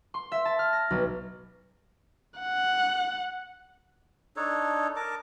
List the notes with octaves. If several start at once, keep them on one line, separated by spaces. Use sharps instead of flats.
C6
E5
A5
F6
A#6
B1
F#5
D4 D#4 A4 C#5
A#4 A5 D6